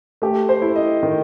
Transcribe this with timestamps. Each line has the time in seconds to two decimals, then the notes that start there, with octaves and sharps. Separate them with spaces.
0.22 A3 G4
0.49 C5
0.62 E4
0.76 D#5
1.03 D#3